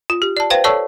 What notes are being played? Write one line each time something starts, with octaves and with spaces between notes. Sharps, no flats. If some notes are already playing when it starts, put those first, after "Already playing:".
F4
G4
D5 A5
B4 C5 F5 G5
A4 C#5 D5 A5 C#6 E6